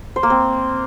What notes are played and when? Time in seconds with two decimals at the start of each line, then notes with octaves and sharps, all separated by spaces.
0.16 C5
0.23 A#3
0.30 C4